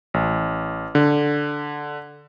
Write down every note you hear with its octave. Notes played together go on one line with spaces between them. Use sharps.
A1
D3